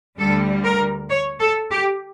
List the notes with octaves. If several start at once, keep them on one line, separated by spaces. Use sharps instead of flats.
D2 D3 G3 A4
A#4
C#5
A4
G4